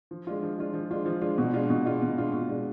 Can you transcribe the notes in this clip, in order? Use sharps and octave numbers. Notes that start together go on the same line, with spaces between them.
F3
G#3 D4 F4
F3
G#3 D4 F4
F3
G#3 D4 F4
F3
G#3 D4 F4
B2
G#3 D4 F4
B2
G#3 D4 F4
B2
G#3 D4 F4
B2
G#3 D4 F4